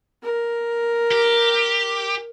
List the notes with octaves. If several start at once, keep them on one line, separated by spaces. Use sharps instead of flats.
A#4
G4